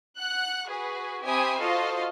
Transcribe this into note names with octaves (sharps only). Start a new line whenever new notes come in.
F#5 F#6
F#4 G#4 B4
C4 G4 E5 G#5 B5 D#6
F4 F#4 A4 C5 D#5 F5